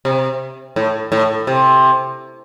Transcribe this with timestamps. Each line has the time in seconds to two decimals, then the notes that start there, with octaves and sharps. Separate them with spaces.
0.05 C3
0.76 A2
1.12 A2
1.47 C3